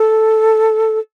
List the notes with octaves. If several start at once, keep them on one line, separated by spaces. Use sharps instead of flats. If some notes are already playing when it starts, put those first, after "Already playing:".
Already playing: A4